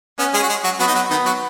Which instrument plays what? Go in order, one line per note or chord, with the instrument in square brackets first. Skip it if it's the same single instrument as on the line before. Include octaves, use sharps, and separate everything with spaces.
[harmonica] B3 [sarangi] C#4
[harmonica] G#3 G#4
F#4
G#3 G#4
F#3 F#4
[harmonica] F#3 F#4 [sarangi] B3
[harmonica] D#4
F#3 F#4
[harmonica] D#3 D#4 [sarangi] B3
[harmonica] F#3 F#4